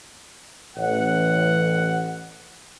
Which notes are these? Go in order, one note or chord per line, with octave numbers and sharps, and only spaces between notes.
A1 F#5